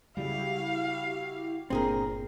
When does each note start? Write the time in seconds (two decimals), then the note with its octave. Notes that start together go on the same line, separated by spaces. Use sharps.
0.17 C#3 G3 E4 F#4 G4 F5
1.70 G1 A#2 C4 D4 G#4 A#4